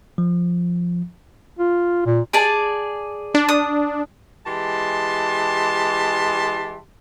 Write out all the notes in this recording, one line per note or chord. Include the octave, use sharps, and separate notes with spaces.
F3
F4
A#2
G#4 D5 A5
D4
D#6
E3 G#3 G4 A5 C6